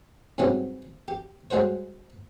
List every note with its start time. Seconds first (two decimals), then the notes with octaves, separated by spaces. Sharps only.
0.38 G#2 C3 F#3 G3 B3 C#4
1.08 G4
1.50 G3 G#3 F#4 C5 C#5